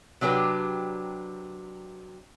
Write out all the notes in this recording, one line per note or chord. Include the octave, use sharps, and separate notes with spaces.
C3 F#3 D4 G4 B4